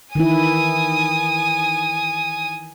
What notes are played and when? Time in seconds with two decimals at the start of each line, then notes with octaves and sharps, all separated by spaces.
0.15 D#3 E3 E4 G#5 D#6